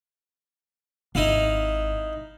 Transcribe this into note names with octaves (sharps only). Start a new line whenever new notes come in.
G#1 D#4 E4 F5